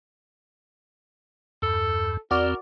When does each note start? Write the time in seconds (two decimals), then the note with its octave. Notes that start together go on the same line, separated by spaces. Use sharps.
1.62 E2 G2 A4
2.31 E2 C4 F#4 A#4 D5